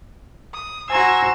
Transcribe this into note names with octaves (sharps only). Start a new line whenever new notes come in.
D#6
F#4 C5 G#5 A#5 E6 G#6 A#6